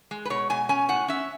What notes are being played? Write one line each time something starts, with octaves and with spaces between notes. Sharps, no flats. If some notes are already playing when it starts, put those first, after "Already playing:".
G#3
B4
B2 C#5
B2 G#5
C#4 G#5
A2 F#5
C#4 E5